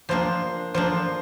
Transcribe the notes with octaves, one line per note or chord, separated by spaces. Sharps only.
F3 A#3 D4 C5
F3 A#3 D4 C5